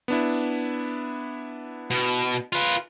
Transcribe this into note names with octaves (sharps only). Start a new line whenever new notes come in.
B3 D4 E4
B2
F4 B4